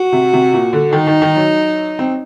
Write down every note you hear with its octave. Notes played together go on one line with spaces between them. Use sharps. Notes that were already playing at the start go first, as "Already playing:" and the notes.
Already playing: F#4
C3
C3
A#2
D3
D#3 D#4
D#3
D#3
F#3
C4